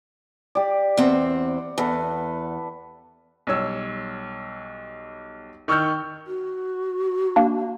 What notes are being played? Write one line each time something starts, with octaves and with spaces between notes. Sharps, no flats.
G4 D5
E2 C4 F#5
E2 A4 B4
B1 G3 C#5 E6
D#3 C#6 E6 F6 G6
F#4
A#3 D4